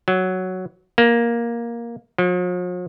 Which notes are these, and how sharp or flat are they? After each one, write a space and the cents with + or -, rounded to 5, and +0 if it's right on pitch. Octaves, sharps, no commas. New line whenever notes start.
F#3 +5
A#3 +10
F3 +45